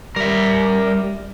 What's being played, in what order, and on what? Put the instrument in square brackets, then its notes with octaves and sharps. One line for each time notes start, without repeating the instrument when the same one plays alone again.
[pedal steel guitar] G3 [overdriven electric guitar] A#4 E5